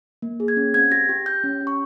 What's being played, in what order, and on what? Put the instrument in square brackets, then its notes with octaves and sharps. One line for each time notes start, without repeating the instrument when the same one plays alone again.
[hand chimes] A#3
G#4
G#6
C#4
C4 G#6
G4 A#6
G4
G4 G6
C#4
G4
C#6